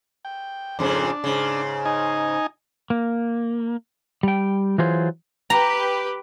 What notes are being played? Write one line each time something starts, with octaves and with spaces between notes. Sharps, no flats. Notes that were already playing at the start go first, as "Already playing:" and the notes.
G5
F2 G#2 C#3 D4
G#2 C#3
D#4 G#5
A#3
G3 G5
E3 F#3 F4 G#4 C5
G4 B4 A#5